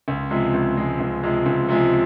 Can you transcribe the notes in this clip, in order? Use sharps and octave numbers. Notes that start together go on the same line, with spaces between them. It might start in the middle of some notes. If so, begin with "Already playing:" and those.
C#2
C3 F3 G#3
C#2
C3 F3 G#3
C#2
C3 F3 G#3
C#2
C3 F3 G#3